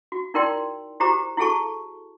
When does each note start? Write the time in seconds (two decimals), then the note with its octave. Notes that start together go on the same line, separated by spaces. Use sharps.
0.12 F#4
0.34 D#4 E4 A#4 D5 G5 C6
1.00 E4 F#4 G4 C5 A#5 D6
1.38 E4 F#4 G#4 A4 A5 C#6